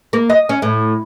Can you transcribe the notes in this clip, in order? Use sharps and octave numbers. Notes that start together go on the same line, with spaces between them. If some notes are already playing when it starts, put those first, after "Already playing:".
A#3
D#5
C#4
A2